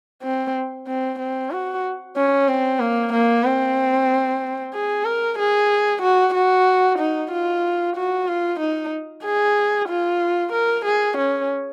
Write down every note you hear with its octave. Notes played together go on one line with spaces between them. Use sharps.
C4
C4
C4
F#4
C#4
C4
A#3
A#3
C4
G#4
A#4
G#4
F#4
F#4
D#4
F4
F#4
F4
D#4
G#4
F4
A#4
G#4
C#4